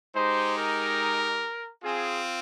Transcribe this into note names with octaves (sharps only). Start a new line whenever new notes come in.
G#3 D#4 G4 C5
A#4
C4 F4 G#4